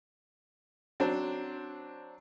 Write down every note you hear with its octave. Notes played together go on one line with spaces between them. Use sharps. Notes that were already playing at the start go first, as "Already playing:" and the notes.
F#3 C4 D4 C5